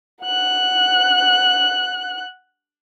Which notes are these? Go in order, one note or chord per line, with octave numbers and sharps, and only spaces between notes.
F#5 F#6